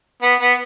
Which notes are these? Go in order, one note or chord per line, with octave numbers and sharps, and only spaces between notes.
B3
B3